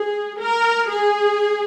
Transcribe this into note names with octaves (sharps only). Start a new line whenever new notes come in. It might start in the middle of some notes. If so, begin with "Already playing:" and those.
Already playing: G#4
A#4
G#4